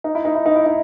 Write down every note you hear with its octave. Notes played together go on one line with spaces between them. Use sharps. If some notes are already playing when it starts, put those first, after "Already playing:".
D#4
E4
D#4
E4
D#4
E4
D#4